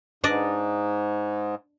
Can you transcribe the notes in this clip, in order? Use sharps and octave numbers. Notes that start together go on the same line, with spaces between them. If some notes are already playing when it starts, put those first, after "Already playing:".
G#2 D4 D5 D#5